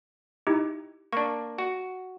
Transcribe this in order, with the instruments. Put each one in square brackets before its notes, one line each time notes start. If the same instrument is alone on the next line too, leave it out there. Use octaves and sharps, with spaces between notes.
[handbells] D#4 E4 G4
[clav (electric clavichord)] A#3 D4 [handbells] C#6
[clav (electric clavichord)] F#4